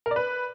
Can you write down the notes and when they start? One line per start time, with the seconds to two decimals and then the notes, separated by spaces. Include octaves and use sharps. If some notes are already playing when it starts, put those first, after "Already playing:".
0.06 A#4
0.11 D5
0.16 B4